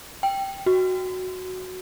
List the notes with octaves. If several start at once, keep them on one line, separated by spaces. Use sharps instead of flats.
G5
F#4